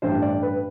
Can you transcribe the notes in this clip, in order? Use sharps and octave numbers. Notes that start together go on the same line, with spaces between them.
A1 G2 E3 C5
D5
B4